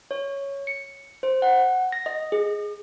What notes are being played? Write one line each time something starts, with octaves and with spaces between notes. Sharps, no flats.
C#5
C#7
C5
F#5
A#6
D#5
G#4